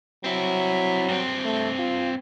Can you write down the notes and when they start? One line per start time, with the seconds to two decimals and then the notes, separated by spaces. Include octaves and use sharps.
0.24 F#3 C4 E4
1.08 G2 C4
1.45 A3
1.78 F4